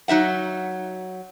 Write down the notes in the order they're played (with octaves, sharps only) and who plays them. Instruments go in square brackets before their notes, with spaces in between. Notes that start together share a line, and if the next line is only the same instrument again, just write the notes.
[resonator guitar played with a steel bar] F#3 D#4 E5 F#5